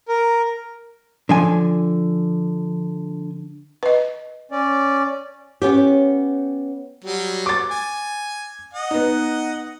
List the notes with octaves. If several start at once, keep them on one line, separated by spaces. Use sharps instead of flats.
A#4
D3 F3 G#5
B4 D#5
C#4 D5
B3 C#4 G4
F#3 G3
D6 A6
G#5
D#5 F#5
B3 D#4